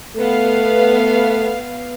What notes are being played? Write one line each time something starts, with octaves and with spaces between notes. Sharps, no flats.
A3 B3 F5